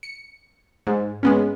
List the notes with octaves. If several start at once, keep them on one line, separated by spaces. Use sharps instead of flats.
C#7
G#2
G#3 B3 C#4